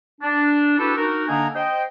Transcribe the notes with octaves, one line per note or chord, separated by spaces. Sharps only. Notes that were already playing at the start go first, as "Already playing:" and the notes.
D4
D4 E4 F#4 G4 A4 B4
D#4 F#4 A#4
D3 A#3 D4 D#5 G#5 A#5
C5 D#5 G5